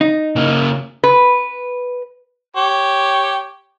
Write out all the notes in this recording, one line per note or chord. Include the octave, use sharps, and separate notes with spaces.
D#4
C#3 A#3
B4
G4 C#5